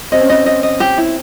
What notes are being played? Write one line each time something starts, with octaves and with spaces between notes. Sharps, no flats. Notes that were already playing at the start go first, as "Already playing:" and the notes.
C4 D#5
C#4
C4 D#5
D#5
D#5
G4
E4